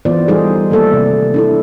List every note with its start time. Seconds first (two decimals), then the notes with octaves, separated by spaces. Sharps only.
0.05 E3 B3 F4 C5 D5
0.28 G3 A3 D#4 G#4 A4 C5
0.70 D#3 A3 A#3 A4 D5
0.93 C3
1.34 D4 E4 A4